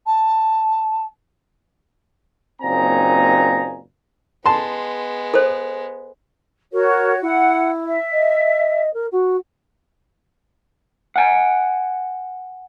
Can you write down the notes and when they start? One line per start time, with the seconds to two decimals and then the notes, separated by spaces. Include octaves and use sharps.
0.06 A5
2.62 F#1 A#2 C4 D#4 G#5 A#5
4.46 G#3 B3 A5 C6
5.34 A4 C5
6.73 F#4 A#4 C#5
7.22 E4 F#5
7.85 E5
8.11 D#5
8.93 A#4
9.11 F#4
11.16 F#5 G#5